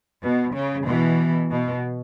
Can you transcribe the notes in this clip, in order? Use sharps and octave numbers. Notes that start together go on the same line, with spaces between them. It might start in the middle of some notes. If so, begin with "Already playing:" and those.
B2
C#3
B2 E3
B2